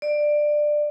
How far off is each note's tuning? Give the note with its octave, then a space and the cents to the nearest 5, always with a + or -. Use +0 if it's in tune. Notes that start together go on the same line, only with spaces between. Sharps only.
D5 +15